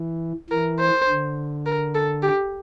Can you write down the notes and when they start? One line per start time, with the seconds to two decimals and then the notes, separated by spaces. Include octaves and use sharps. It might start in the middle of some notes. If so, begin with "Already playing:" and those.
Already playing: E3
0.50 E3 A#4
0.80 C5
1.09 D3
1.66 A#4
1.95 A4
2.23 G4